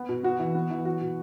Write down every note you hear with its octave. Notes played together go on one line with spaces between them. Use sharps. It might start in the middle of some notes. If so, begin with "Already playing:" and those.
Already playing: B3
B2
B3 F#4
E3
B3
E3
F#3 F#4
B2